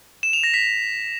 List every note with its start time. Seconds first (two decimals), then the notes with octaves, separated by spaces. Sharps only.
0.23 E7
0.33 F7
0.44 A#6
0.54 B6